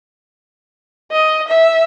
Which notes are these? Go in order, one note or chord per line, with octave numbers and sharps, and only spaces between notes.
D#5
E5